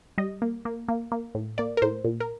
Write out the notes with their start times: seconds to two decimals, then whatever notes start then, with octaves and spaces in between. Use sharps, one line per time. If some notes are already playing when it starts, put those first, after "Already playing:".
0.18 G3 D#5
0.42 A#3
0.65 A#3
0.88 A#3
1.12 A#3
1.35 A2
1.58 A#3 D5
1.77 A#4
1.82 A2 C5
2.05 A#2
2.20 A#4